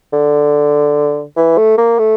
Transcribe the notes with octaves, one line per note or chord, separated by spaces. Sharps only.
D3
E3
A3
A#3
A3